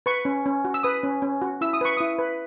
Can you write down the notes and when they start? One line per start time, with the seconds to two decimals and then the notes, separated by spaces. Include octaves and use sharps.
0.06 B4 C#6
0.25 C#4
0.46 C#4
0.65 F#4
0.74 E6
0.83 B4 D#6
1.03 C#4
1.22 C#4
1.42 F#4
1.61 E4 E6
1.73 D#6
1.81 B4 C#6
1.97 E4 D#6
2.19 B4